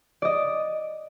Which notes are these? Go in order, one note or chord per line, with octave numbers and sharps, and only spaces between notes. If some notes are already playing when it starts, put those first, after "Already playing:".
D5 D#5